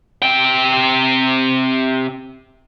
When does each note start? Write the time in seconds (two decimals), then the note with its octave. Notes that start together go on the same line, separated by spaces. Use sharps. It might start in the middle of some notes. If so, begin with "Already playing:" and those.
0.23 C3 G5